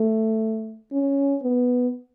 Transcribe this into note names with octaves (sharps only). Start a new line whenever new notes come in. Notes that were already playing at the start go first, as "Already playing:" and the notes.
Already playing: A3
C#4
B3